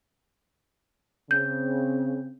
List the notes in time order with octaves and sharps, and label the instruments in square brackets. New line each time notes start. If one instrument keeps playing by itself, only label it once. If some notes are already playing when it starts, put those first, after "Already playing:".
[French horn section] C#3 C4 [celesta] G6